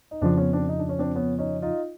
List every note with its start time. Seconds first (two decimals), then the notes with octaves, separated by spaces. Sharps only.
0.11 D#4
0.21 F2 C#3 F3 C4 D4
0.37 B3 C#4
0.53 C4 D4
0.69 D#4
0.79 D4
0.89 C#4
0.99 C4 D4
1.15 B3 C#4
1.39 C#4 D#4
1.62 D#4 F4